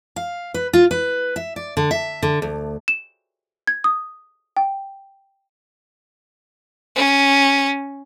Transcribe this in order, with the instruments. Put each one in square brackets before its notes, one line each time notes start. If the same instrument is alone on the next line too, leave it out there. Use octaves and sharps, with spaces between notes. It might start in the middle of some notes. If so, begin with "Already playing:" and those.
[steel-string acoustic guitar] F5
B4
F4
B4
E5
D5
D3
E5
D3
D2
[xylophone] E7
G#6
D#6
G5
[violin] C#4